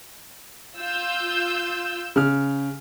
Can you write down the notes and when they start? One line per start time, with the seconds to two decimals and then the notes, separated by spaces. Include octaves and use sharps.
0.78 F4 E6 G6
2.16 C#3 F6